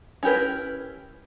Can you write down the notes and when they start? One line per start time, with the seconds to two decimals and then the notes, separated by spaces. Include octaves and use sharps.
0.23 C#4 E4 G4 A#4 B4